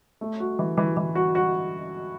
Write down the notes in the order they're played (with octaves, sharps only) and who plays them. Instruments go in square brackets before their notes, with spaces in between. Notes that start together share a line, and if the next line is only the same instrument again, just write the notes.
[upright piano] A3
F#4
E3
E3
E3
F#4
F#4